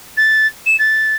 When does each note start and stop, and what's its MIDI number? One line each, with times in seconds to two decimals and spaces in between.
0.17 0.46 93
0.66 0.76 100
0.78 1.16 93